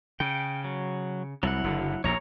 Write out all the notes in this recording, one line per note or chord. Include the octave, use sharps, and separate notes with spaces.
C#3 G5
F#3
C2 F#3 E4 F#5
F#1 D3
A#1 D#2 A#2 C#5 A#5